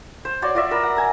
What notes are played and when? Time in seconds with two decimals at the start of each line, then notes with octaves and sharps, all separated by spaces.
0.25 C5
0.42 F#4 C#5 D5 C6
0.55 F4 F#4 D5 E5
0.71 A#4 B4 E6
0.83 F#5
0.97 G#5 A#5